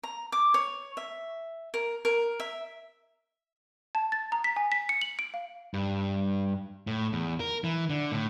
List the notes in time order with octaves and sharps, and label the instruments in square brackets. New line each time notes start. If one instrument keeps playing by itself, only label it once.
[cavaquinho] A#5
D6
C#5
E5
A#4
A#4
E5
[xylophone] A5
A6
A#5
B6
G#5
B6
C#7
F#7
D7
F5
[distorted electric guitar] G2
A2
E2
A#4
E3
D3
A2